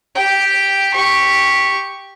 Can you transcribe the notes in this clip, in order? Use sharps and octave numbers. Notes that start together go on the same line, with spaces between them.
G4 G5
G4 C#6